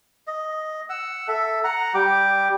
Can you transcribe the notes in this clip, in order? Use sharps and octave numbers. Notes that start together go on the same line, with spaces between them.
D#5
F#5 E6
A4 E5
F#5 A#5
G3 G4 D6